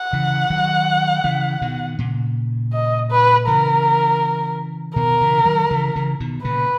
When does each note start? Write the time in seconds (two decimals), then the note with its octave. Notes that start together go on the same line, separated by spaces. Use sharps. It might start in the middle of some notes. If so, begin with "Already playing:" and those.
Already playing: F#5
0.13 C#3 E3
0.50 D#3 F#3
1.24 C#3 E3
1.62 B2 D#3
1.99 A#2 C#3
2.73 D#5
3.11 B4
3.47 C#3 E3 A#4
4.96 B2 D#3 A#4
5.21 C#3 E3
5.45 D#3 F#3
5.71 C#3 E3
5.96 C#3 E3
6.20 B2 D#3
6.44 A#2 C#3 B4